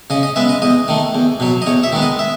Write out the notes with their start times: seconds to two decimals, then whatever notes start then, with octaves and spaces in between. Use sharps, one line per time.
0.10 C#3 D#5
0.23 D#5
0.36 G#3 B3 E5
0.49 D#5
0.62 E2 D#5
0.88 D#3 A3
1.15 E2
1.40 B2 F#3
1.62 D#5
1.67 E2 C#5
1.83 E5
1.92 D#3 G#3 B3
2.02 D#5
2.19 E5